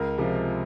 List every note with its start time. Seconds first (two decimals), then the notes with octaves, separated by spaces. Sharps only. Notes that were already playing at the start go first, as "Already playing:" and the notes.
Already playing: C#2 A#4
0.18 C3 F3 G#3